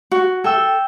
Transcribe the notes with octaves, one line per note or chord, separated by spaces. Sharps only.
F#4
A4 E5 G5 E6